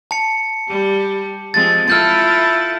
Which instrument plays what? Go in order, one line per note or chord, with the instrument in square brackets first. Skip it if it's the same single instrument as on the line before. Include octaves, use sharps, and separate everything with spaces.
[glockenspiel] A5 C#7
[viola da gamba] G3 G4
[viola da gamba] F3 G#3 C4 [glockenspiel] A6
[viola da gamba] E4 F4 A4 [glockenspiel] F6 G6 A6